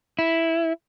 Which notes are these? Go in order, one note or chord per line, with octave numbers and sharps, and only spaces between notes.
E4